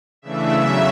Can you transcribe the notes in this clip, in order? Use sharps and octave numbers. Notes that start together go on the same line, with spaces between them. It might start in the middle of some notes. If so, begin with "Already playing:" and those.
C#3 E3 A3 D4 E5
E2 C#3 F#3